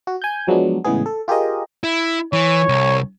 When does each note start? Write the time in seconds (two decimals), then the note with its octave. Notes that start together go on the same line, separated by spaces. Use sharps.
0.07 F#4
0.22 G#5 G6
0.47 F3 F#3 G#3 B3 D4
0.84 A2 C#3 E3 G#3 B3 G#4
1.06 A4
1.28 F4 G4 G#4 A#4 D#5
1.84 E4
2.33 E3 C#5
2.69 C2